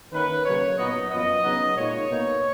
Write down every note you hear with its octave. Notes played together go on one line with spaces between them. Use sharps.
D#3 A#3 C#4 B4
C#3 F#3 A#3 C#5
A#2 F#3 B3 D#4 D#5
F#2 F3 B3 D#5
C#3 F#3 B3 D#4
A#2 G#3 D#4 C#5
B2 A#3 D#4